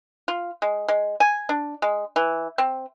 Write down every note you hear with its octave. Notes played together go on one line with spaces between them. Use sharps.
F4
G#3
G#3
G#5
D4
G#3
E3
C4